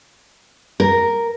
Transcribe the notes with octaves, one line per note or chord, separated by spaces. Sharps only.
A#4